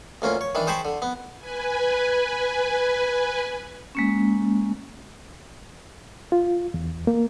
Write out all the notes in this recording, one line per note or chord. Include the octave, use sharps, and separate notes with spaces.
D2 A#3 C#4 F4
C#5
D#3 E3 D4
G#4 C5 G5 A5 B5 C#6
D3
B3
B4 G#5
G#3 A#3 C#4
F4
E2
A#3